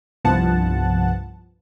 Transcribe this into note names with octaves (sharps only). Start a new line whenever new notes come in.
C2 G2 F3 B3 F#5 A5